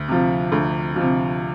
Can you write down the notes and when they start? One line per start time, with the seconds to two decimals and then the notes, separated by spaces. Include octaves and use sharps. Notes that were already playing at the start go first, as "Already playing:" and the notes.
Already playing: D2
0.08 C3 F3
0.52 D2
0.96 C3 F3